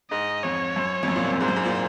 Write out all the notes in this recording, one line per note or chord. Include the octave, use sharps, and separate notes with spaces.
G#2 D#5
F2 C#5
F#2
F2
F#2
A#2
C3
F#2
G#2 C5
F#2
G#2
A#2